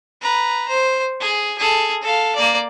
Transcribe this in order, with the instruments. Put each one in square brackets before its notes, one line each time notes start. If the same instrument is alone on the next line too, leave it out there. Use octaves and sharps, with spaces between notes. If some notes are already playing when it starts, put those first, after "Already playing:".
[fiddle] B4 A#5
C5
G#4
G#4 A4
A4 F5
A#3 D5